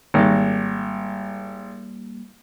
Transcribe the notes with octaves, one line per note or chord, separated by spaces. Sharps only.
G#1 G3 A#3